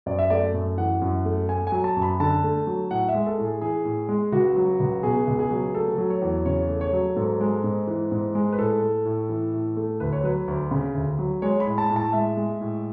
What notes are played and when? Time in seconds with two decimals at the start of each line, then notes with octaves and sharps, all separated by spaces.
0.06 F#2 D5
0.19 E5
0.30 A3 D5
0.54 F#2
0.78 E3 F#5
1.01 F#2
1.25 A3
1.49 A3 G#5
1.67 G#5
1.72 F#3
1.84 A5
1.96 F#2
2.02 B5
2.20 D3 A5
2.44 A3
2.67 F#3
2.91 A2 F#5
3.09 E5
3.15 G#3
3.26 A4
3.38 A2
3.44 G#4
3.61 E3 G#4
3.85 A2
4.09 G#3
4.32 C#2 F#4
4.56 F#3
4.80 C#2
5.03 B2 G#4
5.27 C#2
5.39 G#4
5.51 F#3
5.75 A3 A4
5.98 F#3
6.10 C#5
6.22 E2
6.45 C#3 C#5
6.69 A3
6.81 C#5
6.93 F#3
7.16 G#2 A4
7.41 G#3
7.64 G#2
7.87 E3
8.12 G#2
8.35 G#3
8.52 B4
8.58 A2 A4
8.82 A3
9.05 A2
9.29 E3
9.53 A2
9.77 A3
10.00 D2 B4
10.13 C#5
10.24 F#3 B4
10.48 D2
10.71 C#3
10.94 D2
11.19 F#3
11.42 G#3 C#5
11.60 B5
11.66 A2
11.78 A5
11.90 A2
11.96 A5
12.13 G#3 E5
12.37 G#3
12.61 A2